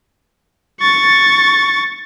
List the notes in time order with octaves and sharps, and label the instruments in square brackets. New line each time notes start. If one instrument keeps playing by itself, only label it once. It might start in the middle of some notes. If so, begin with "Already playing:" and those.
[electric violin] C#6 A6